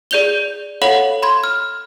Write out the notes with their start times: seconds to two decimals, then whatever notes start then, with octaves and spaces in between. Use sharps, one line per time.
0.11 G#4 D5 G6 F7 G7
0.82 A4 C#5 F5 F#5 B5 F#7
1.23 B5 C6 G#6
1.44 F6